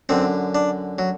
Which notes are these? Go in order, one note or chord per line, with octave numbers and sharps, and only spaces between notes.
F#2 D3 C4
D4
F#3